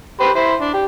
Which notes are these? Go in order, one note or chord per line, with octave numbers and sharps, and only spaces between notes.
G4 B4 C5
E4 C5
D4
G4